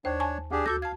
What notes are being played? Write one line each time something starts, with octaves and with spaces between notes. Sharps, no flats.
D#2 D4 C5 C#5
G#5 A5 C#6
D2 D4 G4 G#4
F#4 A4 D6 G6 A#6
F5 A5 G#6